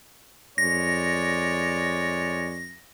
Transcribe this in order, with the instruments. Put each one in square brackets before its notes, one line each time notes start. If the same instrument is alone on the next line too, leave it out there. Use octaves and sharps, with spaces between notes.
[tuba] F2 [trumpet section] G#3 C#5 D5 [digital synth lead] A#6